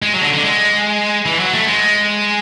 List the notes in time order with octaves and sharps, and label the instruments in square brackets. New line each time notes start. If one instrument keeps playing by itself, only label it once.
[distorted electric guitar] G#3
F#3
D3
D3
G#3
E3
F#3
A3
G#3